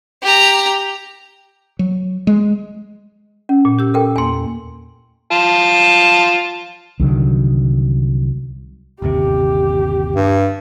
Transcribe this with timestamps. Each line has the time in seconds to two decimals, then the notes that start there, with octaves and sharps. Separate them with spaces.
0.22 G4 A#5
1.79 F#3
2.27 G#3
3.49 C#4
3.65 A#2
3.79 G4 E6
3.94 A4 A#4 G5
4.16 E2 A#3 G#5 C6
5.31 F4 A5
7.00 C2 D3 D#3 F#3
9.02 G1 D#2 C3 G4
10.16 G2